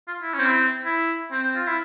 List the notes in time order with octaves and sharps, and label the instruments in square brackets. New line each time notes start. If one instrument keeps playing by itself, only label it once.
[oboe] F4
E4
[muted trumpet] C4 [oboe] C#4
[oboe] E4
E4
[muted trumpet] C4
[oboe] F4
E4